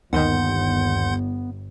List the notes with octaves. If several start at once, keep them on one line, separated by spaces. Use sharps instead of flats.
G1 D#2 D#3 B3 F#5 C6 G6